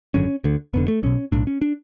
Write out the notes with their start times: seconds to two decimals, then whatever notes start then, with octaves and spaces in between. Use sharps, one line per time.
0.14 G#1 F#2 D3 C#4
0.44 D2 D3
0.73 F1 F2 D3 B3
0.88 A3
1.03 B1 B2 C#4
1.32 B1 A2 D4
1.47 C#4
1.62 D4